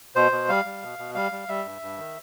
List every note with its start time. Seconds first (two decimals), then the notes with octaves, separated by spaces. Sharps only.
0.16 B2 C5
0.32 B2
0.49 G3 F5
0.65 G3
0.83 B2
0.99 B2
1.15 G3 F5
1.32 G3
1.48 G3 E5
1.65 G2
1.82 G2
1.99 D#3